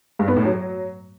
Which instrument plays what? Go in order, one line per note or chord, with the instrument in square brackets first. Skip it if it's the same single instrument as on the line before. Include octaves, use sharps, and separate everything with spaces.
[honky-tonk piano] G2
B3
A2
F#3